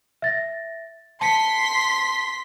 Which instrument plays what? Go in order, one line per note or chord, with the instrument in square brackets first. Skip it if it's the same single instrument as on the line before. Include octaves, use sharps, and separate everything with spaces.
[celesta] E5 A6 A#6
[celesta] A5 C#7 [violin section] C6 B6